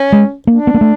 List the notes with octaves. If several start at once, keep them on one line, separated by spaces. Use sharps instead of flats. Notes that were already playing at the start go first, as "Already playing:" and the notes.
Already playing: C#4
G#3
A#3 D4
B3
A#3
A3